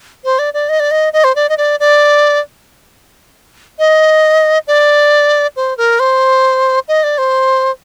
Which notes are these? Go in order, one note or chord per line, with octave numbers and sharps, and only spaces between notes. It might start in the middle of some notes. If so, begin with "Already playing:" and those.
C5
D5
D5
D#5
D5
D#5
D#5
C5
D5
D#5
D5
D5
D#5
D5
C5
A#4
C5
D#5
D5
C5